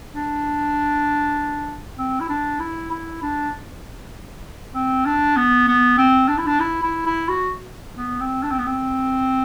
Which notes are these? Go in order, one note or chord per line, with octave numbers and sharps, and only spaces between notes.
D4
C4
E4
D4
E4
E4
D4
C4
D4
B3
B3
C4
D4
E4
D4
E4
E4
E4
F#4
B3
C4
D4
C4
B3
C4